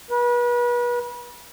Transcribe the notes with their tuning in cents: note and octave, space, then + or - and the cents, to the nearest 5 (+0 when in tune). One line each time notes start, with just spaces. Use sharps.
B4 -35